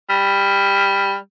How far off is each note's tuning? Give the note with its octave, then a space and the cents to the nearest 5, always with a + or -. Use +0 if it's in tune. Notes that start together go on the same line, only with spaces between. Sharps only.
G3 +15